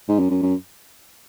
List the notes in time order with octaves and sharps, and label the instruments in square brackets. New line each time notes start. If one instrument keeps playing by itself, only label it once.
[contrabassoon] G#2
F#2
F#2
F#2